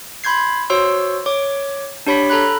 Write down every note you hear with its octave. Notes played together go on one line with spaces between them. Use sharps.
B5 C6 G6 G#6 C7
F#4 C5 C#5 C6 E6
C#5 D6
D4 G4 C#5 B5 C#6 B6
A4 A#5 B5 F#6